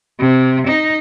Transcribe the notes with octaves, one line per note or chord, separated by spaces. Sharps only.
C3
D#4